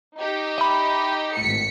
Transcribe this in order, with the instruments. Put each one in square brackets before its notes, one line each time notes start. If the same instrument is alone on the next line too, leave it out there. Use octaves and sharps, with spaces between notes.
[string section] D#4 G4
[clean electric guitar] D#5 E5 B5
[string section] G#1 B6 C#7 [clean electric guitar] A2